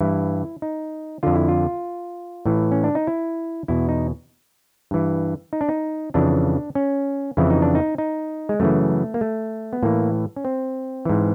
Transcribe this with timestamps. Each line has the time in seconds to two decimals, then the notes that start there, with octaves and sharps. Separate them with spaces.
0.01 G2 E3 E4
0.62 D#4
1.23 F2 D3 F4
1.35 E4
1.48 F4
2.46 A2 E3
2.72 C#4
2.84 D4
2.95 D#4
3.07 E4
3.68 E2 B2 E4
3.89 D#4
4.91 G2 E3
5.53 D#4
5.61 D4
5.69 D#4
6.14 F2 C#3 E3 D4
6.75 C#4
7.37 F2 C#3 E3 E4
7.50 D#4
7.62 D4
7.75 D#4
7.98 D#4
8.49 G#3
8.60 F#2 C#3 E3 A3
9.14 A#3
9.21 A3
9.73 B3
9.83 A2 E3 A#3
10.36 C#4
10.45 C4
11.05 G#2 E3